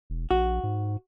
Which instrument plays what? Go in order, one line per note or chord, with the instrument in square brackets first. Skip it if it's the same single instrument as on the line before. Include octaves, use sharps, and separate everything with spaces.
[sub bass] E1
[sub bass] A#1 [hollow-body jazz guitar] F#4
[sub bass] G#2